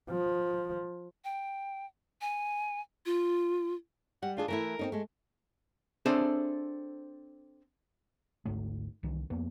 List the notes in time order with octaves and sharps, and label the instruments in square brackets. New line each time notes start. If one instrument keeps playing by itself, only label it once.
[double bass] F3
[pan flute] G5
G#5
F4
[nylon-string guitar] G3 [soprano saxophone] F#5
[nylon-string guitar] D#3 D4 G#4 [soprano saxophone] F4
[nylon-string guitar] E3 A3 E4 [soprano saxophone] A#4
[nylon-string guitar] C4 C#4 D#4
G#3 A3
[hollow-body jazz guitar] C4 D4 G#4 A4 C5 E5
[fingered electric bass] G#1 D2 G#2 A3
C2 D#3 E3
F2 A#3 B3